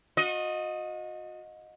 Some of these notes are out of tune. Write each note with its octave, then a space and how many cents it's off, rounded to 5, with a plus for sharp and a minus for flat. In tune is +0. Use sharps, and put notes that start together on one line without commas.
F#4 -40 D#5 +0